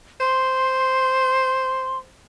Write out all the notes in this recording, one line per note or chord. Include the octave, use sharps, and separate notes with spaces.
C5 C6